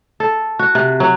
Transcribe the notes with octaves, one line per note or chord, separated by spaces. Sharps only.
A4
F#4
C3
F#3